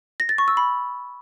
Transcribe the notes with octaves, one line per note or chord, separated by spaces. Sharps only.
A#6
A6
C#6
E6
B5